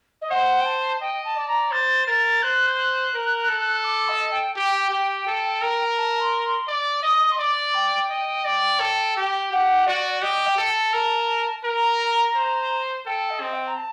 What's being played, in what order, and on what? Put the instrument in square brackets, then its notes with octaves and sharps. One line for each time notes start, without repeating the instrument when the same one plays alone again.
[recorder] D#5
[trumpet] C5 [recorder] F#5
[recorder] G5
A5
[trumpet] D#5 [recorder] G5
[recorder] A5
[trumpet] D5
[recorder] A#5
[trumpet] C5 [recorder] A6
[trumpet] A#4 [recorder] A6
[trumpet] C5 [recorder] F#6
[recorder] G6
F#6
[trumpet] A#4
A4
[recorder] D6
D#5
G5
[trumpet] G4 [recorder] G5
[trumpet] G4
A4
A#4
[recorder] A5
C6
C6
[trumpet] D5
[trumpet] D#5 [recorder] D#6
[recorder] C6
[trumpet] D5 [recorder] D6
[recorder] G5
[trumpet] D#5
D5
A4
G4
[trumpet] G4 [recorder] F#5
[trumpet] F#4 [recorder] D5
[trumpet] G4 [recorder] D#5
[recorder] G5
[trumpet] A4
[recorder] A5
[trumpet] A#4
[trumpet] A#4 [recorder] A#5
[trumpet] C5
[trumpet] A4 [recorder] G5
[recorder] D#5
[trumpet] C4
[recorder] G5
A#5
A5